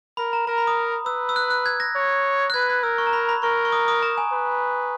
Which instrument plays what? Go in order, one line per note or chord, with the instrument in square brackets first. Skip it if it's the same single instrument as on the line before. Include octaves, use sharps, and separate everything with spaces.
[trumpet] A#4 [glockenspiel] B5
[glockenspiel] A#5
[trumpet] A#4 [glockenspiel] A#5
[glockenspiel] B5
D#6
[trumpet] B4 [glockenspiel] E6
[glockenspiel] E6
F#6
F#6
G#6
A#6
[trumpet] C#5
[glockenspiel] F#6
[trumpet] B4 [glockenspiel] G#6
[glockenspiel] G#6
[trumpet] A#4 [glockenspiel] E6
[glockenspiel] C#6
A#5
B5
B5
[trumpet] A#4 [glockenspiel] C#6
[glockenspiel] C#6
D#6
D#6
A#5
G#5
[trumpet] B4